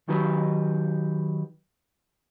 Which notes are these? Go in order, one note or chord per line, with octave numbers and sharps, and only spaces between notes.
D#3 F#3 D#4 G4 B4